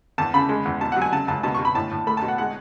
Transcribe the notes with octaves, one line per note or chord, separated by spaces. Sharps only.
E2 A5
C#3 B5
G#3
E2
B2 A5
F#3 F#5
G#5
C#3 A5
C#2 A5
B2 A5
B2 C#6
B5
A2 A5
A2
A3 B5
A5
B2
F#5
G#3 F#5